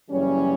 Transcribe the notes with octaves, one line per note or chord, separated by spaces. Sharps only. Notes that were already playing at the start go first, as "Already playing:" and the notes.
F#1 F#2 E3 G3 C#4